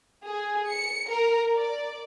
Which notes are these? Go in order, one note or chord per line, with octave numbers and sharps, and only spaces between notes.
G#4
C#7
A#4
D5